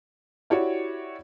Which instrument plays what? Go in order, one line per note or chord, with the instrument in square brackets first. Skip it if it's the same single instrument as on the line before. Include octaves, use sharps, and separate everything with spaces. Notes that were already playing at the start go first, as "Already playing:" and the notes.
[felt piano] E4 F#4 G4 C#5 D5